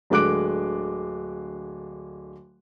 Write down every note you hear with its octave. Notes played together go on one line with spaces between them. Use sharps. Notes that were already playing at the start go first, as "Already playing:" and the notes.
D1 D3 G#3 D6 F#6 D7